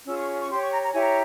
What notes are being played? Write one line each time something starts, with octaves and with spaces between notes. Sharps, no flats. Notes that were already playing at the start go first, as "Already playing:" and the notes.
C#4 F4 G#4 E6
C#6
C#6
G4 C#5 C6
C#6
A#5
A#5
E4 G4 C#5 G#5
A#5